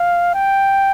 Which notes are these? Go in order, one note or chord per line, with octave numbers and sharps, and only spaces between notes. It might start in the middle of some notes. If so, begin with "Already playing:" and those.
Already playing: F5
G5